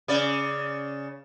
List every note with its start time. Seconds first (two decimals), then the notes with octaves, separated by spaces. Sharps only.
0.08 C#3 D5